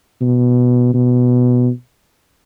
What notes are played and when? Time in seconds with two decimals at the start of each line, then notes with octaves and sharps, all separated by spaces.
0.21 B2
0.94 B2